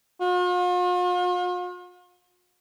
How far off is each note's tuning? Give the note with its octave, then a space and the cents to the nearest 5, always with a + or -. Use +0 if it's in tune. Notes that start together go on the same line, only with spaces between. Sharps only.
F4 +45